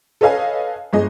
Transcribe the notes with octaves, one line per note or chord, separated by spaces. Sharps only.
A4 B4 C#5 D#5 F5 G#5
G1 G#4 D#5